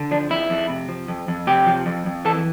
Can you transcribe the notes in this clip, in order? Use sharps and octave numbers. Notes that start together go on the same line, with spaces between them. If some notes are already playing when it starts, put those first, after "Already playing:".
Already playing: D3
F3 D4
F2 E4
F2
C3
F3
F2
F2
C3 G4
F3
F2
F2
E3 A4